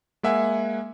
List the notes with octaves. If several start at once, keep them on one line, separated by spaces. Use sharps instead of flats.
G#3 A#3 E5 F#5 G#5